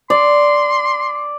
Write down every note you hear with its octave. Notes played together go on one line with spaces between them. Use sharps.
D5 C6